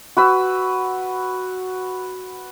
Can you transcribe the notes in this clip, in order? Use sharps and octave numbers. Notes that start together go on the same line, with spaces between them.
F#4 B4 E6